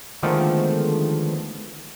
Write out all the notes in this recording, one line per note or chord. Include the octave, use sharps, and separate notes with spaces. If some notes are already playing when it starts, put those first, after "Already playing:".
D3 D#3 F3 G#3 A3 B3